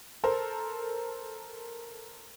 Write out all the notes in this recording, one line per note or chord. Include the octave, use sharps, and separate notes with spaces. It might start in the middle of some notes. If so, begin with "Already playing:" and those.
A4 A#4 C5